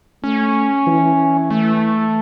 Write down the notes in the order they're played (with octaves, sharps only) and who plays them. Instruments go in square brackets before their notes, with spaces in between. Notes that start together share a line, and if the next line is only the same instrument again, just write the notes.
[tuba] A3 [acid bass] C#4
[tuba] E3
[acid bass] A3